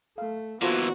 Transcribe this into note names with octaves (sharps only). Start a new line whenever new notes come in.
A3 F5
A#2 E3 B3 F4 F#4 A4 C5